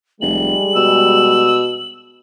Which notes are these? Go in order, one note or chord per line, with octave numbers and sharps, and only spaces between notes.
F1 G3 G#3 F#7
B2 E6